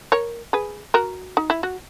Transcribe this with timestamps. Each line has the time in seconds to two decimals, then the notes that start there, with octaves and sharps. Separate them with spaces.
0.12 A#4 C#5
0.53 G#4 B4
0.94 F#4 A#4
1.37 D#4
1.50 E4
1.63 F#4